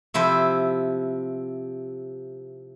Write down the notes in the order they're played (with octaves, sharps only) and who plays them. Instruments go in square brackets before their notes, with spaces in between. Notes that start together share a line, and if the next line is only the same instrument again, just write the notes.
[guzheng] C3 F3 E4 C5